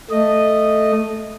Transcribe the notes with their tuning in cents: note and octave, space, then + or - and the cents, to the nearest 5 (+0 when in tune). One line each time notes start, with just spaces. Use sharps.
A3 +0 D#5 -10